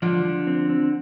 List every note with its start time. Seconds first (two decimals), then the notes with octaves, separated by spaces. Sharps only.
0.02 D3 F3 D4
0.25 F3
0.47 C4
0.70 C4